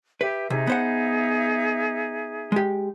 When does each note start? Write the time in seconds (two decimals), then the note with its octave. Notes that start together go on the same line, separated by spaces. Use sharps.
0.21 G4 B4 E5
0.50 C3 D#4 G#4 E5
0.67 B3 C5 F#5
2.52 G#3 G4